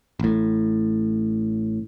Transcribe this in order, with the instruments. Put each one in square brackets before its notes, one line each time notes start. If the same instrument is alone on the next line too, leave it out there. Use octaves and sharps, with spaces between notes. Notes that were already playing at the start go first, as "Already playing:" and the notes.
[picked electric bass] A1 A2